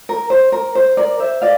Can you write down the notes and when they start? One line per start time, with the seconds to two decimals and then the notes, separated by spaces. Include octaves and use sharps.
0.09 A#4
0.30 C5
0.52 A#4
0.75 C5
0.97 A#4 D5
1.20 C5 E5
1.42 D5 F5